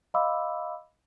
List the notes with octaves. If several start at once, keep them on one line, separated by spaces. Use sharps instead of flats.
D#5 F5 B5 C6 D6 E6